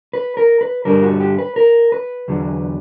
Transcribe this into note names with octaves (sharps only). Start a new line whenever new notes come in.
B4
A#4
B4
G2 D3 G3 A#4
F#4
G4
B4
A#4
B4
E2 D3 F#3